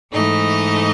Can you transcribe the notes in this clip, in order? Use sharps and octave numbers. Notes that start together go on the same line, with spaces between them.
G#2 E3 A3 D#4 D#5